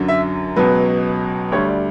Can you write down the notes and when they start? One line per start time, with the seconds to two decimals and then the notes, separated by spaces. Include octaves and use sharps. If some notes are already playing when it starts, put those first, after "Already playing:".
Already playing: F#2 D3 F#3
0.08 E5
0.56 C#2 B2 F#3 B4
1.52 D2 D3 G3 C#5
1.68 D5